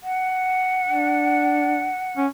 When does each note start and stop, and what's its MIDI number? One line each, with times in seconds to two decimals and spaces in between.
0.03 2.22 78
0.88 1.90 62
2.17 2.27 61